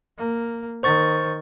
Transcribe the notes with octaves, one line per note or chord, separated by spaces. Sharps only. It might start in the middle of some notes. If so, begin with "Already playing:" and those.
A#3
D#3 C5 C#6 A6